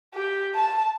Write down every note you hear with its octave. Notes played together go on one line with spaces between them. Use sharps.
G4
A5